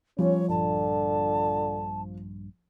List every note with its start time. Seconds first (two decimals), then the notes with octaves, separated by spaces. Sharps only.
0.19 F3 G3 C#4 C#5
0.49 A#1 G2 D3 A5